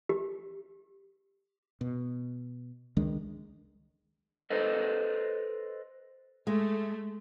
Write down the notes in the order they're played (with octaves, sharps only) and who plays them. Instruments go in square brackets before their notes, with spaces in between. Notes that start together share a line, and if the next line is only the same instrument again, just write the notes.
[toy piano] G4
[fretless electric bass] B2
C#2 D#3 G#3 D4
[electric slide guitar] A4 B4 C5 D#5
[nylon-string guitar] G#3 [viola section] A3